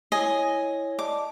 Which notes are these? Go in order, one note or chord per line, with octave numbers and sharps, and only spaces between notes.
E4 C#5 D#5 G#5
D5 D#5 A5 D6